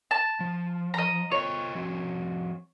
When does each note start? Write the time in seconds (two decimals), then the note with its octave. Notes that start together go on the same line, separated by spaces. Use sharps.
0.11 A5
0.40 F3
0.94 D#5 A#5
1.32 F4 C5 C#5 D#5
1.75 F3 C4 F#4